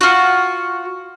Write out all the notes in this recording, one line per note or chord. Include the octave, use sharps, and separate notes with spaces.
F4 F#4